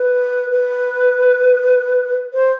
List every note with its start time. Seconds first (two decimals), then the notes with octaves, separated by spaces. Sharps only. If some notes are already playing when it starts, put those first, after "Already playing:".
Already playing: B4
0.51 B4
2.33 C5